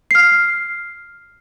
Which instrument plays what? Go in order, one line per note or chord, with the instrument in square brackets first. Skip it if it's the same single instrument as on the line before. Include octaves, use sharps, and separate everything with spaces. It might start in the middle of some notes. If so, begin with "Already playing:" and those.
[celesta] F6 C7